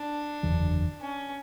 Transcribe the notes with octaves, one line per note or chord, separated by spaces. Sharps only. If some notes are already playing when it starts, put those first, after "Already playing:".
Already playing: D4
F#1 E2 D3 F#3
C#4